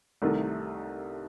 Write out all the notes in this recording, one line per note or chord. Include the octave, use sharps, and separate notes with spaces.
C2 C3 D#3 A3